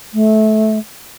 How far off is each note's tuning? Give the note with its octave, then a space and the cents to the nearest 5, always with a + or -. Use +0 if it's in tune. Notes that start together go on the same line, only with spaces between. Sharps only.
A3 -20